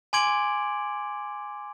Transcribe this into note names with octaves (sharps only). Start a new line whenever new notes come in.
G#5 C6 D6 G#6 D7 F#7